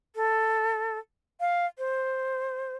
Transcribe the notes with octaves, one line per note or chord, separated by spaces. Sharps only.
A4
F5
C5